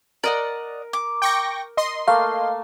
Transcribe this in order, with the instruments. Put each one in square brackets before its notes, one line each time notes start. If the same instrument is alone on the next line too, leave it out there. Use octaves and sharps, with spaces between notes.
[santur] A#4 [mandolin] D5 D#5 F#5
[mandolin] D6
[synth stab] G5 C#6 A#6
D#5 C6
[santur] A3 A#3 [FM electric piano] F5